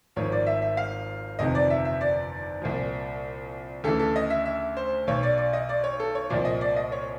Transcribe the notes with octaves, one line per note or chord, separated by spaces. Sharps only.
G#1 G#2 F3 C#5
D5
E5
E5
F5
G1 F2 C3 D#3 D#5
D5
E5
E5
D5
C2 A#2 F3
D2 C#3 E3 A4
A4
D#5
E5
E5
C5
B1 B2 C#5
D5
D5
D#5
D5
C#5
A4
C#5
C2 A#2 F3 D5
D#5
D5
D#5
C#5